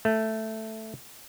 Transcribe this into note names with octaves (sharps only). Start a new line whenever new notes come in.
A3